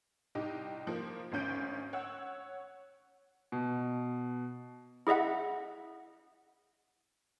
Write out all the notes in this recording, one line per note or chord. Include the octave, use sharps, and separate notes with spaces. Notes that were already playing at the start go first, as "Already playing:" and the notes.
C2 D#4 G4
F3 A#3
G#1 D2 C#4 G6 D7
C#5 F#5 E6
B2
E4 G#4 D#5 E5 F#5